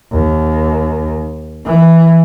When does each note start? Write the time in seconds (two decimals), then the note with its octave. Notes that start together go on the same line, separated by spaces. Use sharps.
0.12 D#2
1.66 E3